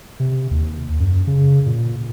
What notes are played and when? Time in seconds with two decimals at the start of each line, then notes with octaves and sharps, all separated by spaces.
0.20 C3
0.51 D#2
1.00 F#2
1.27 C#3
1.66 A#2